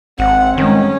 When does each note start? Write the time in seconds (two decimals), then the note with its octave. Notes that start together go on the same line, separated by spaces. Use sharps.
0.19 G#1 C4 F#5
0.58 G2 D#3 G#3 C#4